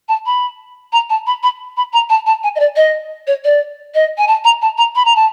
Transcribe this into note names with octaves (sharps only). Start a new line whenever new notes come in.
A5
B5
A#5
A5
B5
B5
B5
A#5
A5
A5
G#5
D#5
D5
D#5
C#5
D5
D#5
G#5
A5
A#5
A5
A#5
B5
A#5
A5